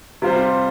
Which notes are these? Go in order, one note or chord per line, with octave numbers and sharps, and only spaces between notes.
C3 G3 F4 C5